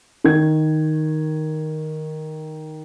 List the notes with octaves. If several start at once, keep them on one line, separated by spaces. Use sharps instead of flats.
D#3 G#6